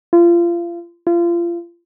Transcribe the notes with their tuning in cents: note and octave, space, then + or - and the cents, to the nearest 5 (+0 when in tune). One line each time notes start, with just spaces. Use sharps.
F4 -30
F4 -30